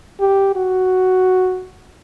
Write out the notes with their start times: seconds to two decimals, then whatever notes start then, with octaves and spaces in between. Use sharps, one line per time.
0.20 G4
0.56 F#4